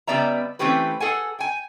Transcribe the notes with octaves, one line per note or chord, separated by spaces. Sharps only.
C#3 G3 B3 D5 E5 A#5
E3 A3 C4 C#4 G4 B4
G#4 A4 F#5 G#5
G5 G#5